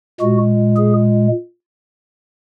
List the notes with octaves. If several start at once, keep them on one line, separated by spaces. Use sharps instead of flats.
A#2 G#3 F#4
G#4